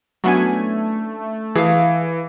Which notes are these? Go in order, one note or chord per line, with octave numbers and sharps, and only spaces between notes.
F#3 A3 B3 C#4 D4 E4 G#5
E3 G#4 F5